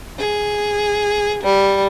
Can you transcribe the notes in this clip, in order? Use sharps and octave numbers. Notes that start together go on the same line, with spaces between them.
G#4
G3